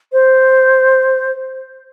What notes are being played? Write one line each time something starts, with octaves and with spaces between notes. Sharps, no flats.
C5